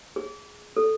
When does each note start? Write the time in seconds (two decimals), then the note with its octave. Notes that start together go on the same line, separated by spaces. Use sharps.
0.16 G#4
0.77 A4